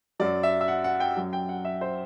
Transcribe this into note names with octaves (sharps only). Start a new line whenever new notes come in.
F#2 F#3 D5
E5
E5
F#5
F#5
G5
F#2 F#3
G5
F#5
E5
C5